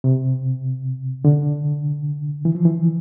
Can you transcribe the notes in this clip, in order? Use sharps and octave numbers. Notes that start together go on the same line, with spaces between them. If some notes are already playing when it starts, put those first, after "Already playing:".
C3
D3
E3
F3
E3